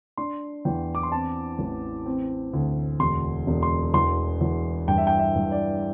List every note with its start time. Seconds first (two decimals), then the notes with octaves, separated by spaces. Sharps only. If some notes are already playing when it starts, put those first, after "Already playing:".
0.17 D4 C6
0.65 E2 G5
0.95 D6
1.03 C6
1.12 C4 A5
1.59 A1
2.06 C4
2.53 D2
3.00 E1 C6
3.47 E1
3.63 C6
3.94 E2 C6
4.41 E2
4.88 G2 G5
4.98 E5
5.07 G5
5.19 E5
5.35 G2
5.51 D5